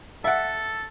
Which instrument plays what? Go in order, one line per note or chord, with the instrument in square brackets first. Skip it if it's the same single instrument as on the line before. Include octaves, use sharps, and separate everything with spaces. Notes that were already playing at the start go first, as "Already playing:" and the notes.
[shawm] A4 [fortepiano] E5 F#5